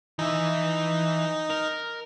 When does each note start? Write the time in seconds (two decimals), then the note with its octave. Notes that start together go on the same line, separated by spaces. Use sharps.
0.19 E3 D#4 E5
1.50 A#4